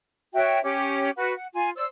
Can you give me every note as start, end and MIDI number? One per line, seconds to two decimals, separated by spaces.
0.34 0.60 66
0.34 0.60 73
0.34 0.60 76
0.34 0.60 79
0.63 1.09 61
0.63 1.09 67
0.63 1.09 86
1.17 1.32 66
1.17 1.32 71
1.17 1.32 78
1.36 1.48 78
1.54 1.70 65
1.54 1.70 80
1.75 1.85 72
1.75 1.85 74
1.75 1.85 88